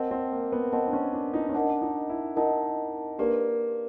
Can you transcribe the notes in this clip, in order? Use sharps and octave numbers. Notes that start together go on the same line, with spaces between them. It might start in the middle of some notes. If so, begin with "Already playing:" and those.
Already playing: C4 A#4 D#5 F#5 A5
C4
A#3
B3
C4 A#4 D#5 F#5 A5
D4
C#4
D4
D#4
C#4
D4 A#4 D#5 F#5 A5
D#4
E4
D#4 A#4 D#5 F#5 A5
A#3 D4 G4 B4 D5